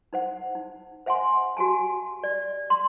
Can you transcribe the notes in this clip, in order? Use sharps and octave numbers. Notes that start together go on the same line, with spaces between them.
D#4 C5 F#5
D#4
C5 E5 F#5 G#5 C6
F#4 G4 G#5 A5
D5
C6